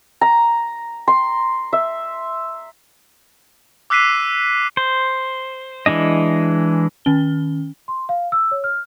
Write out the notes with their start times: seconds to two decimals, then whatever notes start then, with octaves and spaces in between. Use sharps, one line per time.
0.21 A#5
1.08 C6
1.73 E5
3.90 D6 E6 F#6 B6 C7 D#7
4.77 C5
5.86 E3 G#3 D4 D#5
7.05 D#3 C#4 G7
7.88 C6
8.09 F5
8.32 E6
8.51 C#5
8.64 F6